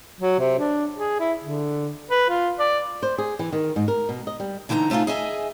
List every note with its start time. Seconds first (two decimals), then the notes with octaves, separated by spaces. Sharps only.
0.21 F#3
0.39 C3
0.59 D4
0.95 G#4
1.20 E4
1.41 D3
2.10 B4
2.29 F4
2.59 D5
3.02 C5
3.18 G#4
3.39 E3
3.53 D#3
3.76 G#2
3.88 A#4
4.09 B2
4.27 D#5
4.40 G3
4.69 D3 E3 D#4 G#5 A#5
4.90 C3 A3 D#4 F4 G#4
5.07 G#4 D#5 E5 G#5